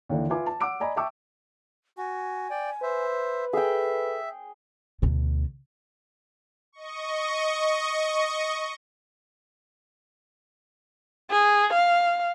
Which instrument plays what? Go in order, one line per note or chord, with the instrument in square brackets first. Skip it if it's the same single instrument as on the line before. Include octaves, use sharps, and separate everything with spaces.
[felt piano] D#2 D3 E3
F4 B4 E5 G#5 D6
A5
F#5 D6 E6 D7
D5 D#5 G#5 A#5 B5
E5 G5 A5 C#6 D6 E6
[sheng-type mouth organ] F#4 [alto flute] G#5
[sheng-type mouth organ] D5 G5
[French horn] B4 [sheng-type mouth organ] C5 E5
[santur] G#4 G5 [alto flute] A4 [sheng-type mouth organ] E5
[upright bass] D2 B2
[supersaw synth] D#5 C#6
[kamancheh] G#4
F5